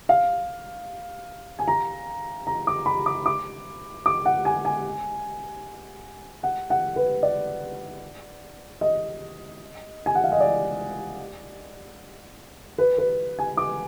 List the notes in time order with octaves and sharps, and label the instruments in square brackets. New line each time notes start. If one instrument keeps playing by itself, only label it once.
[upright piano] F5
G#5
A#5
A#5
D6
B5
D6
D6
D6
F#5
G#5
G#5
F#5
F#5
B4
D5
D#5
G#5
F#5
F5
D#5
D5
B4
B4
G#5
D6